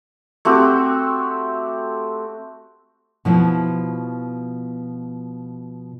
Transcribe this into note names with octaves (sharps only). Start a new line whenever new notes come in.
A3 C4 F#4 G4
B2 F3 E4 C5